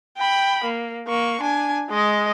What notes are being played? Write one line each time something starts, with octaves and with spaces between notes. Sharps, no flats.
G5 B5
A#3
A#3 C#6
D4 G#5
G#3 D#5